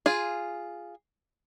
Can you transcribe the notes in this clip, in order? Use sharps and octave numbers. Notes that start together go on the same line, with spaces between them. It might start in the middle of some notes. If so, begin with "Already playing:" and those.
F4 G#4